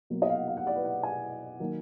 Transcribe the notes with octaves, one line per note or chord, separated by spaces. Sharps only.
B2 F#3 A#3
D#5
F5
F#5
F5
F#5
D5
B4
F#5
G#5
D#3 F#3 A#3